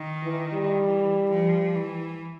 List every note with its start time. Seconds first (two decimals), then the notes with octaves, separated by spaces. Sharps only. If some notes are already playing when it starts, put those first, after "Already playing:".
Already playing: D#3
0.23 E3
0.53 G3
0.84 E3
1.29 F3
1.75 E3